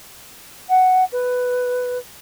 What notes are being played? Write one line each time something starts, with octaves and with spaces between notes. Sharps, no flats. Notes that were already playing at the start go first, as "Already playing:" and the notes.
F#5
B4